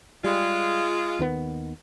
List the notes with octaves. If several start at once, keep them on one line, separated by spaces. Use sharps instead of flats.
G3 G#3 F4
D#2 D#3 B3